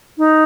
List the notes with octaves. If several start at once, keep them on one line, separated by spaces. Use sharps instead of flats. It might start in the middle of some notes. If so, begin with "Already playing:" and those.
D#4